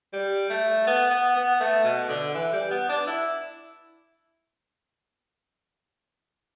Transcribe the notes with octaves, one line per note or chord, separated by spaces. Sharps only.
G3
A3
B3
B3
B3
A3
B2
D3
E3
G3
B3
D4
E4